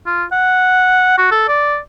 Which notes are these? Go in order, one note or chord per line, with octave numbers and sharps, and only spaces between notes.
F4
F#5
F#4
A4
D5